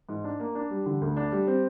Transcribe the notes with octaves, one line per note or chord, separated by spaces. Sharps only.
G#2
D4
A#3
D4
G3
D3
D2
D4
G3
C4